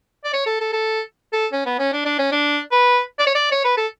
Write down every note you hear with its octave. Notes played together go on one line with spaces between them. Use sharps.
D5
C#5
A4
A4
A4
A4
C#4
B3
C#4
D4
D4
C#4
D4
B4
D5
C#5
D5
C#5
B4
A4